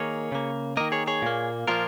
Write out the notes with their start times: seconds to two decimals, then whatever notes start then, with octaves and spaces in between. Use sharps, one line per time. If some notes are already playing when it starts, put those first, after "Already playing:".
Already playing: D#3 A#3 G#4 C#5
0.32 C#3 A#3
0.77 D#3 A#3 A#4 D#5
0.92 G#4 C#5
1.07 G#4 C#5
1.22 A#2 A#3
1.68 A#2 F3 A#3 F4 A#4